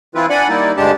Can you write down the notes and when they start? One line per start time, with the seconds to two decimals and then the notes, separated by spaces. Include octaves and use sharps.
0.15 E3 C4 E4 F4 B4
0.30 D4 D5 F#5 G#5 B5
0.49 D#3 G3 A#3 D#4 E4 D5
0.77 D2 G2 G#3 D4 G4 A5